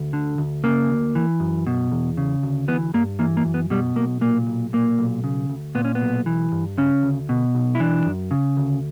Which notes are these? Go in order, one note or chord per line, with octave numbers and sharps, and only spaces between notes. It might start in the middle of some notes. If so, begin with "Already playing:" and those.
Already playing: D2
D3
D2
C#3 A#3
D2
E3
F#2
B2
E2
C#3
D2
E3 B3
G2 A#3
E3 A#3
A#3
F#2
B3
B2 G3
B1 A#3
A#2 A#3
B1
A#2 A#3
B1
C#3
D2
A#2 B3
C#4
B3
B1
E3
G2
C#3 C#4
D2
B2
B1
E4
E3 D4
F#2
C#3
D2